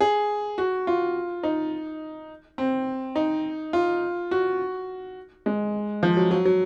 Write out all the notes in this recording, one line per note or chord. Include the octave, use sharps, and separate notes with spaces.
G#4
F#4
F4
D#4
C4
D#4
F4
F#4
G#3
F3
F#3
F#3
F#3